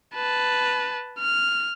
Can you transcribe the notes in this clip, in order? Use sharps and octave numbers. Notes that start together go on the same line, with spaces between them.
B4 A5
F6